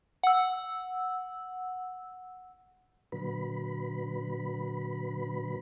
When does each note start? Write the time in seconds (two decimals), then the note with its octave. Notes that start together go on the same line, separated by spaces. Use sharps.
0.23 F#5 E6
3.12 A#2 D3 F#3 B4 B5